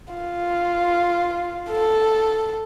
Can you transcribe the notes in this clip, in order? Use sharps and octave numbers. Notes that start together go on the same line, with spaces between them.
F4
A4